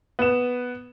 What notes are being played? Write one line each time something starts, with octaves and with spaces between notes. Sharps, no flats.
B3 E7